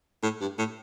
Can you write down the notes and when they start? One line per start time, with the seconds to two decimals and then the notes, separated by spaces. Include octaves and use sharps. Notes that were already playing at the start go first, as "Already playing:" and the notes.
0.23 A2
0.41 G2
0.58 A2